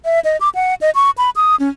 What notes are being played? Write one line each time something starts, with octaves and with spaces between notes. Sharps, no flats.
E5
D#5
D6
F#5
D#5
C#6
B5
D#6
C#4